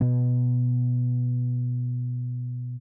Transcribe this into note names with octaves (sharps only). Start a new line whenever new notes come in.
B2 B3